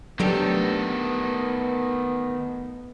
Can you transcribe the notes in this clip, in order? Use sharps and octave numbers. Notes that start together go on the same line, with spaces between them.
D#3 F#3 A3 B3 D4 G4 A4